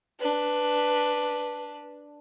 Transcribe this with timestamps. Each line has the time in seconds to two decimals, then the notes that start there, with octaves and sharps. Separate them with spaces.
0.20 D4 B4